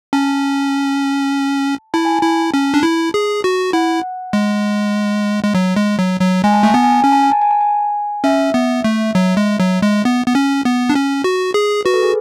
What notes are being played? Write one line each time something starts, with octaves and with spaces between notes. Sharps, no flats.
C#4 A5
E4 A5
G#5
A5
E4
C#4
D4
E4
G#4
F#4
E4 F#5
G#3
G#3
F#3
G#3
F#3
F#3
G#3 G#5
A5
A3 G#5
B3 A5
G#5
A5
C#4 G#5
A5
G#5
A5
G#5
A5
G#5
C#4 E5
B3
A3
F#3
G#3
F#3
G#3
B3
B3
C#4
B3
D4
C#4
F#4
G#4
F#4 B4
A4
G#4